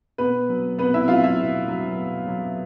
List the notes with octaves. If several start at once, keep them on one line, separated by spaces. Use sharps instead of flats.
B2 B3 B4
F#3
B2 B3 B4
E4 E5
F#3 F4 F5
E4 E5
B2
F#3
B2
F#3